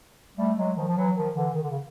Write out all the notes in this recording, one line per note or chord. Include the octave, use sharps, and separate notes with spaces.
G3 A3
F#3 G#3
D#3 F3
F3
E3 F#3
D#3 F3
D3 E3
D#3
D3
C#3